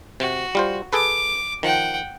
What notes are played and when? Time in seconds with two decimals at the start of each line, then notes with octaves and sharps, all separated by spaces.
0.20 C3 F#4
0.55 G3 F4 C5
0.93 G#4 A4 B4 D6
1.63 D#3 F3 F#5 G5